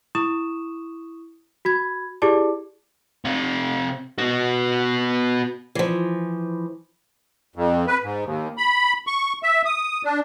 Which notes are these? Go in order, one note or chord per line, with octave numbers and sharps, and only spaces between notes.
E4 C#6 D#6 E7
F#4 B5 G#6
E4 G4 G#4 D5 A5 D6
C3 F5
B3 F#4
E3 F3
F2
B4
G#2
D#2
B5
C#6
E5
D#6
D4